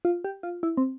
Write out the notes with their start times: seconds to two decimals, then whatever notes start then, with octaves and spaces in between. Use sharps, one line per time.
0.05 F4
0.24 G4
0.43 F4
0.63 E4
0.78 C4